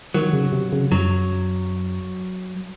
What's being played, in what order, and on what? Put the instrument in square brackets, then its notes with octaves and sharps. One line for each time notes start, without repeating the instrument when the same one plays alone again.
[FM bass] D#3 [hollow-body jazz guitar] F#3
[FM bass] C#3
C3
C#3
[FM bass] F#2 [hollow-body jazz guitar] F#3